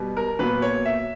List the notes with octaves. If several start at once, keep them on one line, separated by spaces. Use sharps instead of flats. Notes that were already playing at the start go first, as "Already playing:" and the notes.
Already playing: B2 G3 B3
A#4
A#2 F#3 B3 B4
C#5
E5